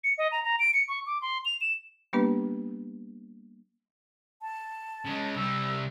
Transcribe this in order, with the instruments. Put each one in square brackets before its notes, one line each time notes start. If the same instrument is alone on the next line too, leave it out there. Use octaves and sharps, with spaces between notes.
[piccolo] C#7
D#5
A#5
A#5
D7
C#7
C#6
D6
C6
F7
E7
[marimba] G3 A#3 B3 D4 G4 B4
[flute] A5
[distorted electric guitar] C#3 G#3
[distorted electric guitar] C2 G3 [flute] E6